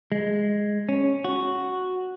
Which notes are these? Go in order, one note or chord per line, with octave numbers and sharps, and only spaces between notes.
G#3
C#4
F#4